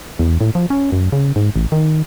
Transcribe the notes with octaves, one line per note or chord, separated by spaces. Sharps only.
E2
A2
F3
C#4
F#2
C#3
G#2
A1
D#3